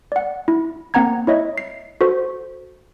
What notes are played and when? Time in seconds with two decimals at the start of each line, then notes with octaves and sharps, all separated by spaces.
0.12 D5 F#5
0.48 E4
0.94 A#3 C4 F#5 A#5 G#6
1.27 E4 C#5 D#5 E5
1.58 C7
2.01 F#4 A4 C5